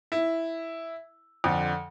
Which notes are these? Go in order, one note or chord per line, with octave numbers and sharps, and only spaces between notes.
E4
F2 D3